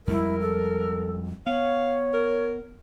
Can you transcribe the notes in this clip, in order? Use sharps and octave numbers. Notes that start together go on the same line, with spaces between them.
F2 G3 G#3 E4 A#4
A4
B3 C#5 F5
A#4